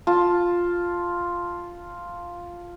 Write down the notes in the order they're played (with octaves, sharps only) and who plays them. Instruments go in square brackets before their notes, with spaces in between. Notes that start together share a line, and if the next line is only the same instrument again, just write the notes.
[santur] F4 A5